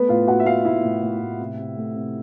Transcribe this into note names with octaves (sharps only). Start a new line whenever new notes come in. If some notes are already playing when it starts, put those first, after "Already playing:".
Already playing: A3 B3 B4
A2 F4 F5
A2 F#4 F#5
E5
A3 F4 F5
A2 E4 E5
A2
A2
A2
C3
C3
A3
C3